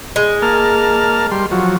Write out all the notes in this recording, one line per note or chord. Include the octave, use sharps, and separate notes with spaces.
G#3
A#3 A5 F6
G3 C6
F3 F#3